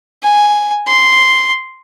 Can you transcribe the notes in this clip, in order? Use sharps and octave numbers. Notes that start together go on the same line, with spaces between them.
G#5
C6